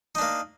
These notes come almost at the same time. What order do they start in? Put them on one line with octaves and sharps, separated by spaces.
D#4 D4 A#3